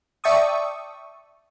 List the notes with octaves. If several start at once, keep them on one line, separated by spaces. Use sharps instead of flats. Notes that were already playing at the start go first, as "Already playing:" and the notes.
D5 E5 G5 A5 C#6 D#6